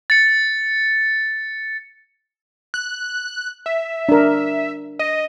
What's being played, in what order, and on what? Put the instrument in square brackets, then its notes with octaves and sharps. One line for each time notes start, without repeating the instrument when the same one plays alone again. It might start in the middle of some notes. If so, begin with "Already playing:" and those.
[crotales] A6 C#7
[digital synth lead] F#6
E5
[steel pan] D4 A#4
[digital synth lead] D#5